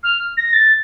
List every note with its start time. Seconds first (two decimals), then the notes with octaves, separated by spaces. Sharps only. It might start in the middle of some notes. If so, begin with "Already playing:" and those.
0.03 F6
0.37 A#6
0.53 A6